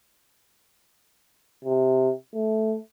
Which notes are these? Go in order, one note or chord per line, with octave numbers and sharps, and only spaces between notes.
C3
A3